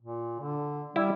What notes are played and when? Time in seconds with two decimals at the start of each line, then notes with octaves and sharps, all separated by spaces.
0.01 A#2
0.39 D3
0.96 G3 E4